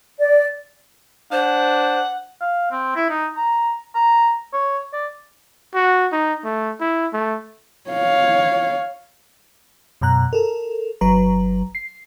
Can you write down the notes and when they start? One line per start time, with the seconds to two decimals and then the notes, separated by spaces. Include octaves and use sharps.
0.19 D5
1.32 D4 C5 F#5
2.41 F5
2.72 C4
2.96 E4
3.10 D#4
3.37 A#5
3.95 A#5
4.53 C#5
4.93 D5
5.74 F#4
6.12 D#4
6.44 A3
6.80 E4
7.13 A3
7.90 C#5 F5
10.01 F#2 B2 A#5 F#6
10.33 A4 A#4
11.01 G1 F#3 B4 A#5
11.75 C7